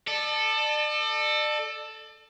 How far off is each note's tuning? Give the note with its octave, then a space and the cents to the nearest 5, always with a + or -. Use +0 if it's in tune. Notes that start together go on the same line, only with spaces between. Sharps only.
A4 +0 D5 +40